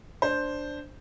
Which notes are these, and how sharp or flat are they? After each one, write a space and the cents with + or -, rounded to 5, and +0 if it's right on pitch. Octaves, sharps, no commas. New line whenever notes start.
D4 +0 C5 +0